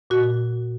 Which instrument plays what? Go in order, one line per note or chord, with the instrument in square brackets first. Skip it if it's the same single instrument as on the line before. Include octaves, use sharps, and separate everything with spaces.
[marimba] A#2 F#4